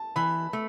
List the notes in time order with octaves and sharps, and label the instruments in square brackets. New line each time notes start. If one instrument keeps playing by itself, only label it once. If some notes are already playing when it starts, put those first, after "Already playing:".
Already playing: [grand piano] A5
[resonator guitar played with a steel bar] E3 [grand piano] B5
[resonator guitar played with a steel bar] A3